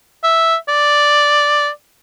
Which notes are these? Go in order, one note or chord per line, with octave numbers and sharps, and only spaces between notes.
E5
D5